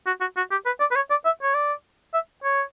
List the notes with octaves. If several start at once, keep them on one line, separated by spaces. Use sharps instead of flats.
F#4
F#4
F#4
G4
B4
D5
B4
C#5
D5
E5
C#5
D5
E5
C#5